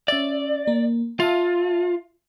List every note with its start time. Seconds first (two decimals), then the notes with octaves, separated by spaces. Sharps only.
0.08 C#4 D5 E5
0.67 A#3
1.20 F4 E5 F5 A5